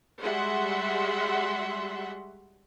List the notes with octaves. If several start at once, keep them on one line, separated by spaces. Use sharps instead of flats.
G3 G#3 F#4 E5 F#5 C6